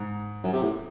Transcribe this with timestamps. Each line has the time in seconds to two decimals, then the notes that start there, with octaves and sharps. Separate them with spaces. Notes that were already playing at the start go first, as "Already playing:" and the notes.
Already playing: G#2
0.44 F#2
0.53 C3
0.63 A2